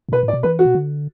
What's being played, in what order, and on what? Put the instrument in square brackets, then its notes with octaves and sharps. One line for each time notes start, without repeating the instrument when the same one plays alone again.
[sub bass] A2
[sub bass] B2 [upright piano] B4
[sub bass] A2
[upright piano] D5
[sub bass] B2
[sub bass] E3 [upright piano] B4
[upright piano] F#4
[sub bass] B2
D3